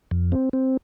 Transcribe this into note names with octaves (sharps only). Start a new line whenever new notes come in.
F2
C4
C4